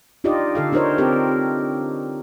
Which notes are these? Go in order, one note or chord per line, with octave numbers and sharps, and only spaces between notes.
D4 D#4 F4 G4 D5 D#5
D3 A4 F5
D4 D#4 F4 A#4 C5 C#5
C4 G4 A4 A#4